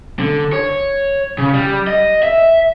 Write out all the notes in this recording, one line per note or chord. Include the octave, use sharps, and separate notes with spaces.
D3
C#5
C#3
G3
D#5
E5